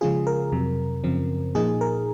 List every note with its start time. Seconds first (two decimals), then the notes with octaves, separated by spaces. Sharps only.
0.01 C#3 F3 G#3 C#4 F4 G#4
0.27 A#4
0.52 F2 C3 F#3
1.04 F#2 C#3 F3 C4
1.55 A#2 F3 A#3 D#4 G#4
1.81 A#4